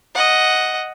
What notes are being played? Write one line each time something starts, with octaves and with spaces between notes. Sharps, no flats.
D#5 F#5